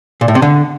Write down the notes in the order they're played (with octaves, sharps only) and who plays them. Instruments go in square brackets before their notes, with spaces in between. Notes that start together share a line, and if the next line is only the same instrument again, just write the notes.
[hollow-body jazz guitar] A#2
A2
C3
D3